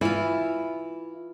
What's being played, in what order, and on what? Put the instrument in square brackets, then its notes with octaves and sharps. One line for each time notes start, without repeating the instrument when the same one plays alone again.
[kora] E3 [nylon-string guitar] E4 F4